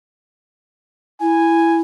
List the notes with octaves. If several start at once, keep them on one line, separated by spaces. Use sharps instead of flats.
E4 G#5